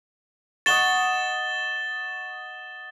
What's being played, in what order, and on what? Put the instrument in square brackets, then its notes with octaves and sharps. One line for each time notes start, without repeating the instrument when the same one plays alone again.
[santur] D#5 F#5 C#6 [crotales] A6 E7 G7